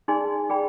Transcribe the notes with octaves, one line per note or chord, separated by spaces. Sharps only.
D#4 G#4 D5 G#5 C6
G#4 D5 G5 B5